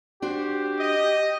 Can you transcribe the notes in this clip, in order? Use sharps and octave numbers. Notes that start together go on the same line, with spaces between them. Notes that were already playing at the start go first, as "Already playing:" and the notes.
D4 F#4 G4 C5
D#5